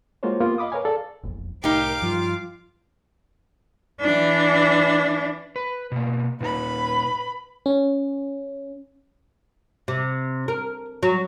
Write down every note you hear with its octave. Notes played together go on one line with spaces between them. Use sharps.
G#3 A#3 F4 F#4 C5 C#5
A#3 B3 F4 G4 A#4 B4
D#5 F5 B5 D6 D#6
A#4 B4 C#5 F5 G#5
G#4 A4 D5 F5
E1 A#1 F2
C2 A2 D#4 G4 A#4 F5 D6
G2 F3 G3 F4
E3 D4
B4
B2 A#3
A#2 D#4 B4 B5
C#4
C3
A#4
F#3